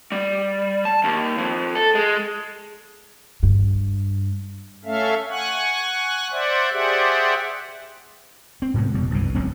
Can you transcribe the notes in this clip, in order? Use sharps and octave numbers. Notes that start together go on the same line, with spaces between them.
G3
A5
D#2
F2
A4
G#3
G2
A3 C#4 A4 E5 F5
F#5 G#5 C#6 F#6
C5 D5 E5 F#5
G4 G#4 C5 D5 E5 F#5
C4
G#2 C3 G#3 B3
F1 B2 G3
F#1 C2 G2 B2
D1 B1 C4 C#4